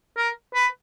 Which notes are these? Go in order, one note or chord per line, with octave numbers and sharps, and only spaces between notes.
A#4
B4